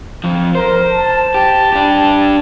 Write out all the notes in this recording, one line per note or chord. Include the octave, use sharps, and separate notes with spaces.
F2 F3
A#4 C5
A5
G4
D4 G4